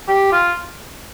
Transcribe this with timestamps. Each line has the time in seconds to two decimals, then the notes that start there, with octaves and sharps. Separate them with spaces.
0.08 G4
0.32 F4